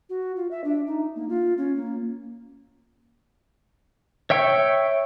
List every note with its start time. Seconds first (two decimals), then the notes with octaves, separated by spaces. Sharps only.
0.09 F#4
0.36 F4
0.51 E5
0.64 D4
0.87 D#4
1.16 A#3
1.29 F4
1.58 C#4
1.76 A#3
4.30 C#5 E5 G5 C#6